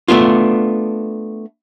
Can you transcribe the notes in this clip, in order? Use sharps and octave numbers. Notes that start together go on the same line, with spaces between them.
A3 B3 D4 F4